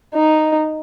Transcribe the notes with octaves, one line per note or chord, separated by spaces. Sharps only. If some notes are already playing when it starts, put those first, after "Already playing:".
D#4